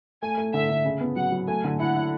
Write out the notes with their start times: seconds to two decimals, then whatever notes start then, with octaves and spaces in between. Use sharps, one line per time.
0.22 A3 G#5
0.37 A3
0.54 D3 E5
0.70 D3
0.85 C#3
1.01 B3
1.16 F#3 F#5
1.32 F#3
1.48 A3 G#5
1.64 D3
1.79 E4 F#5
1.96 E4